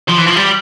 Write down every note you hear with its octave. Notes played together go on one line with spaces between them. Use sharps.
F3
E3
F3
G3